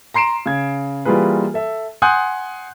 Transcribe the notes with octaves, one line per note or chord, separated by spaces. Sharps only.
A#5 C6 C7 D7 E7
C#3 G#6
E3 G3 A#3 F4 G#4 B4
A4 E5
F#5 G#5 C6 D#6 F#6 G6